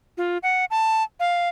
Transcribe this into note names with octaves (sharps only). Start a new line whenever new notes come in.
F4
F#5
A5
F5